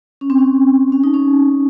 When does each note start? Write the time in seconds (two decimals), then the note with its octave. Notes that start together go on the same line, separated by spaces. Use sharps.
0.21 C#4
0.30 C4
0.38 C#4
0.92 C#4
1.04 D#4
1.14 C#4